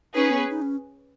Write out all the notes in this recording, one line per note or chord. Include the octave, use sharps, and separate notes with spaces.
C#4 D#4 G#4 B4
B3
D#4
C#4